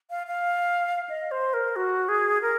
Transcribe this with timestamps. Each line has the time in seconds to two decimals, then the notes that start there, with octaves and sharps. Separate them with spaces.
0.10 F5
0.27 F5
1.10 D#5
1.31 C5
1.54 A#4
1.76 F#4
2.09 G#4
2.42 A#4